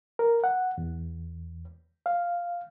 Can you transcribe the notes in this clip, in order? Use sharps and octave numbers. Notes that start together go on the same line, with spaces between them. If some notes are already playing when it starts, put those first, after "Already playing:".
A#4
F#5
E2
F5